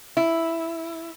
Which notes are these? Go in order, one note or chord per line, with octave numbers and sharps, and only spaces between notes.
E4